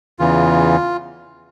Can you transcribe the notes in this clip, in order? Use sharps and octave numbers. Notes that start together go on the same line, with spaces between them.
E2 C#3 E3 F4